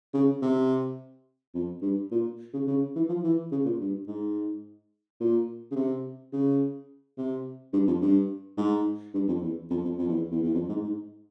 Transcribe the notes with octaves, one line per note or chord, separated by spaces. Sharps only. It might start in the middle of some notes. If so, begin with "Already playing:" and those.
C#3
C3
F2
G2
A#2
C#3
C#3
E3
F3
E3
C#3
A#2
G2
G#2
A#2
C#3
C3
C#3
C3
G2
F2
G2
G#2
G2
F2
E2
F2
F2
F2
E2
E2
E2
F2
G#2
G#2